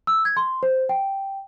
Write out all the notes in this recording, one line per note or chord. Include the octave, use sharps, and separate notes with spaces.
E6
G#6
C6
C5
G5